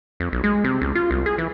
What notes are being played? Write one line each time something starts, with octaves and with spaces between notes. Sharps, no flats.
F2
B1
G#3
C3
C#2
F4
C2
G#4
E3